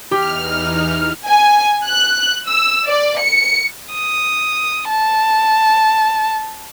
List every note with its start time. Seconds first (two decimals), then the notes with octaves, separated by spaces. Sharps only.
0.11 E2 E3 D#4 G4 F6
1.29 G#5
1.87 F#6
2.48 E6
2.88 D5
3.21 C#7
3.94 D#6
4.89 A5